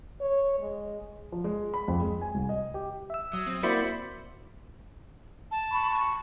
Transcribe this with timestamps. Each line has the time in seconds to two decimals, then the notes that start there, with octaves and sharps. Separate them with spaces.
0.21 C#5
0.60 G#3
1.32 F3
1.44 G#3
1.74 B5
1.88 F2
2.01 G#3
2.21 G#5
2.34 C2
2.49 D#5
2.74 G4
3.10 E5 E6
3.33 F#3 D#6
3.47 C4
3.63 A#3 E4 F#4 C5 D5 B5 C#7
5.51 A5
5.71 B5 C#6
5.90 C#6